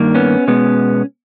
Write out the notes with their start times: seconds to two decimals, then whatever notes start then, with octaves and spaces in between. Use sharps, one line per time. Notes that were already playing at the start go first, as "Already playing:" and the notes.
Already playing: G2 D#3 A#3
0.14 B3 C#4
0.47 B2 G#3 B3